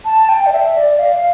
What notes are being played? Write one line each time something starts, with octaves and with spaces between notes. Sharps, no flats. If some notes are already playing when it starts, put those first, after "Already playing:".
A5
G5
D5
E5
D5
F5